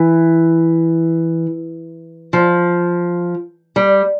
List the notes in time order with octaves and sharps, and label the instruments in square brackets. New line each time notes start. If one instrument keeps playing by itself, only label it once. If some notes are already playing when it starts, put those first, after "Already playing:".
Already playing: [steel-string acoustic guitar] E3
F3
G3